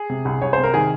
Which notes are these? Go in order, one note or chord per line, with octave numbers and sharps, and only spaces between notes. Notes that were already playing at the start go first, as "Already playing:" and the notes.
Already playing: G#4
C3
C2
C2 C#5
C3 C5
A#4
D#3 G#4